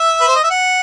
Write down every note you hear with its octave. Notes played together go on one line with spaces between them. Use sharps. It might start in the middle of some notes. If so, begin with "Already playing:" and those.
Already playing: E5
B4
C5
D#5
E5
F#5